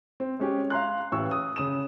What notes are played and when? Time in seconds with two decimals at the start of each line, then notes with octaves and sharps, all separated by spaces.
0.20 C4
0.40 G#3 C#4 G4
0.70 F5 A#5 C6 F#6
1.12 A1 E3 C#6 E6
1.31 D#6
1.56 C#3 D#6 E7